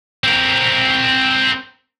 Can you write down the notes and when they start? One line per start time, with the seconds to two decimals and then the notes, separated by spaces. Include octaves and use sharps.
0.24 C4 A#4